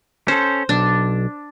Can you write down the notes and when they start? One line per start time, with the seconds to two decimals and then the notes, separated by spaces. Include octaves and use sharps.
0.28 C#4 A4 C5
0.69 B1 D4